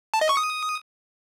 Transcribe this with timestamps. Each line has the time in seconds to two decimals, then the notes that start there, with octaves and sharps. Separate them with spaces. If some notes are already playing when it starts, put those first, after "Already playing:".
0.14 A5
0.21 D#5
0.29 C#6
0.37 D#6